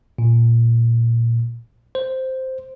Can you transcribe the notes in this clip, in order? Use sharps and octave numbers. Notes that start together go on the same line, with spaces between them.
A#2
C5